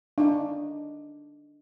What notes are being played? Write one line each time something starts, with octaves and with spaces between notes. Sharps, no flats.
D4 D#4